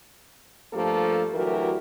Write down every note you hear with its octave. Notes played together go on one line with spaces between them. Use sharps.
G2 F3 A3 A#3 G4 A4
D2 E3 F#3 G4 A#4